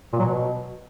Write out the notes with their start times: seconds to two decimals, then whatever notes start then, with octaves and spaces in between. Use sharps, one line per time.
0.13 A#2
0.19 F#3
0.25 B2